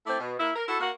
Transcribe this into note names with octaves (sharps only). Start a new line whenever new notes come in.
A3 C4 E4 D5
B2
A#3 E4
A#4
E4 F#4 A4
A#3 F#4